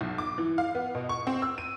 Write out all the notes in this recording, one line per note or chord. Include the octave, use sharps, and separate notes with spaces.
B1
D6
E3
F5
B3
B2
C#6
C4
E6
D#7